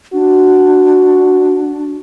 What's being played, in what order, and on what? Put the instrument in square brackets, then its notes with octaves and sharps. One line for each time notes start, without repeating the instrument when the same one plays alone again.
[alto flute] D4 [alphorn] F#4